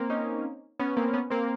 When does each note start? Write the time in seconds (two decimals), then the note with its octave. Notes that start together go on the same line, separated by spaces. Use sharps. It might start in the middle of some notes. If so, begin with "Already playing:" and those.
Already playing: A#3 C4
0.10 C#4 D#4
0.80 B3 C#4
0.97 A#3 C4
1.13 B3 C#4
1.30 A#3 C4